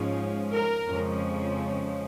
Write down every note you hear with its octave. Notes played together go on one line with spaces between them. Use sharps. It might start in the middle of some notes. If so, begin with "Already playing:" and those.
Already playing: G#2 F3 G#3 C#4
A#4
F2 C#3 F3 G#3 C#4